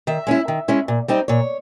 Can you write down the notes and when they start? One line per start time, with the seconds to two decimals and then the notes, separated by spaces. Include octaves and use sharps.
0.07 D#3 E5
0.27 G#3 C#4 E4
0.48 D#3
0.68 G#3 C#4 E4
0.88 A#2
1.08 G3 C4 D#4
1.28 A#2 C#5